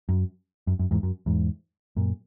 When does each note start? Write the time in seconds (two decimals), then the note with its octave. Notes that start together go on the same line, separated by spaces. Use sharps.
0.09 F#2
0.67 F#2
0.79 F#2
0.91 E2 G#2
1.03 F#2
1.26 E2 G#2
1.96 F#2 A#2